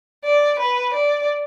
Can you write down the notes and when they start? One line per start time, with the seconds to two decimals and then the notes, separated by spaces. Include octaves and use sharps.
0.24 D5
0.59 B4
0.94 D5